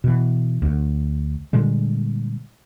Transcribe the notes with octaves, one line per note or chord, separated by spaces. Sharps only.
B2 E3
D2
A#2 D3 G3 G#3